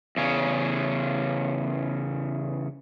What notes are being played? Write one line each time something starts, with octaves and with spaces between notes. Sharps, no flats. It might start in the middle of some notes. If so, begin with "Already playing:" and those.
E2 C#3 C#4